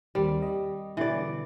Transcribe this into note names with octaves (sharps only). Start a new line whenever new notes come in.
D#2 D#3 G3 C4
D#5
B2 D3 E3 D5